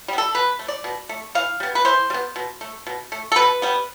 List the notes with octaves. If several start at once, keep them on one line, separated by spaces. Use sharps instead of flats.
G3 B3
A4
B2 B4
A3
D5
B2
A3
E3 F5
G3 B3
B4
E3 C5
G3
B3
B2
A3
B2
A3
A4
B2 B4
G3 B3